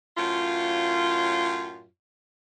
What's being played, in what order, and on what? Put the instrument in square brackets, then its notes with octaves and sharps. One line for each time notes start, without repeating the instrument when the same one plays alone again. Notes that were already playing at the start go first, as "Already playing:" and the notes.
[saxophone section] F#2 A2 F4